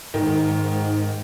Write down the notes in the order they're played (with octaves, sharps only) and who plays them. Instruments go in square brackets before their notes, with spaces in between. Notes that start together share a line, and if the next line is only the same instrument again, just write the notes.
[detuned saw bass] G#2 [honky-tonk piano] D#3